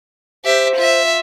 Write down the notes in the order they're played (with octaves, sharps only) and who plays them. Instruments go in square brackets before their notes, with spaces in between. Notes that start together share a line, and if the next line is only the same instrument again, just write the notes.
[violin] G4 E5 [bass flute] C5
[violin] F4 E5